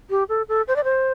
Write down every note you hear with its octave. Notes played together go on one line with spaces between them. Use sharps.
G4
A4
A4
C5
D5
C5